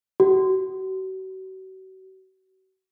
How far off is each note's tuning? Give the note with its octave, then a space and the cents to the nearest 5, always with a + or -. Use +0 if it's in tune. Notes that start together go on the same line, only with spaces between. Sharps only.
F#4 +40